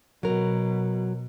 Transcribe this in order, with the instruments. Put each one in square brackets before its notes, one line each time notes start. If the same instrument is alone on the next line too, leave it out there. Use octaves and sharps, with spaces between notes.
[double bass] B2 [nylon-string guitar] F#3 A#4